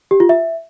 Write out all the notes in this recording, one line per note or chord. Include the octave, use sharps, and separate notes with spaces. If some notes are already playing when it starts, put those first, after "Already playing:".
G4
F4
E5